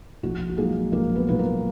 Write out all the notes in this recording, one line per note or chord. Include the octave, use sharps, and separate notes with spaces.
A#1 F#4
F#4
A#2 F#3 G#3 A#3 D#4 G#4
A#1 A#3 A#4
B3 B4
A#2 F#3 A#3 D#4 B4
A#3 A#4